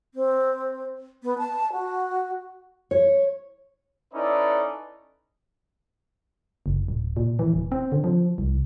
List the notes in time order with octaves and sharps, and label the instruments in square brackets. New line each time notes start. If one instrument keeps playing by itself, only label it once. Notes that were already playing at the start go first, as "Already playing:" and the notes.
[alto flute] C4
B3
A5
F#4
[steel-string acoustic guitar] C#5
[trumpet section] C#4 D#4 E4 A4 B4 D5
[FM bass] F#1
D1
A#2
E3
D#1
C4
D3
F3
C2